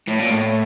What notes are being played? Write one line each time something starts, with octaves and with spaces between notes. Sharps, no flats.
A2
A#2
A2